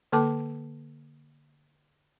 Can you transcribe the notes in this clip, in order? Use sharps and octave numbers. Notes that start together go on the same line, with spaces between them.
D3 A#3 A4 A5 D6